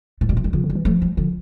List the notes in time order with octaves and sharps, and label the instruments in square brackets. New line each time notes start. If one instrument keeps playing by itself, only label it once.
[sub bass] A2 [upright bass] A3
[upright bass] G3
[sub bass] A#2
[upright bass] F3
G3
[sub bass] C#3 [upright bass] F3
[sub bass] D3
[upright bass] G3
[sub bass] E3
[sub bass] F3 [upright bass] A3
[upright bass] G3
[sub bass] D3 [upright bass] F3